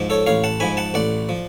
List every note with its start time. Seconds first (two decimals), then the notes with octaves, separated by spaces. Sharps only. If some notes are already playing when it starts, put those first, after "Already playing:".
Already playing: G#2 F3
0.10 A4 C#5
0.26 A1 C#5 F5
0.44 F#5 A5
0.60 G#2 F3 G#5 B5
0.77 F#5 A5
0.94 A1 D5 F#5
1.29 F3